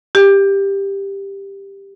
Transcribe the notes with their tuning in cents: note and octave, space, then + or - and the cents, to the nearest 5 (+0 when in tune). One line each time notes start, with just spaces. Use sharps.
G4 +10